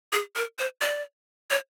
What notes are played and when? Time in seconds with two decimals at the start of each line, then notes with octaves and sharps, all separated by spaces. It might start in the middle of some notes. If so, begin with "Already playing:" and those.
0.13 G#4
0.36 A#4
0.59 C5
0.81 D5
1.50 C#5